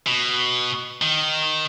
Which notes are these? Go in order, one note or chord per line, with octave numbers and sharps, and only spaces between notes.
B2
D#3